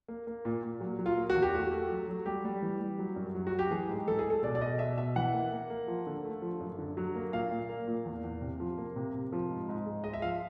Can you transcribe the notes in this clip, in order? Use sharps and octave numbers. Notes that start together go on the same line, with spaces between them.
A#3
A#3
A#2
A#2
F#3
F#3
F4
A#3
F#4
E2
G4
A3 F#4
A3
F#3
F#3
G3 G4
G3
E3
G3
F#3
F#2
F#3
F#4
F#3
G4
E3 G#4
G#2
E3 A4
G#4
A3 A4
B2 D5
D5
B2 D#5
B2 E5
B2 E5
E3 F#5
A#3
A#3
A#3
F3
D3
A3
F3
F#2
D3
F#3
A#3
A#2 F5
A#2
A#3
A#2
E2
E2
C3
F3
A#3
C3
C3
F3
G#2
G#2
G#3
G#3 D#5
E5
F3 F5